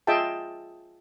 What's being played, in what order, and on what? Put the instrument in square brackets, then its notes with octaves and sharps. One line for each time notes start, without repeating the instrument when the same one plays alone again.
[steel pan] F4 G#4 D#5 E5 G5 A5